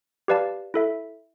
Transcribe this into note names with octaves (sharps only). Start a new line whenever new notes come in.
G4 B4 D5 F5 A5
E4 A4 E5